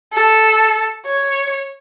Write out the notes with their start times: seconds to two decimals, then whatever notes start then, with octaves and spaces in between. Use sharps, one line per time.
0.14 A4
1.07 C#5